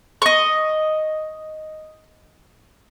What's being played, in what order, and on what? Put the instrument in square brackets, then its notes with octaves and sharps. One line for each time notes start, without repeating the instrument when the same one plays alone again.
[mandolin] D#5 C#6